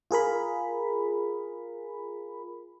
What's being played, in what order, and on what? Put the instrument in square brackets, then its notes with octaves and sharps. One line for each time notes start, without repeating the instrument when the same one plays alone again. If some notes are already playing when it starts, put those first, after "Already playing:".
[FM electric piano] F4 G#4 A#4 B5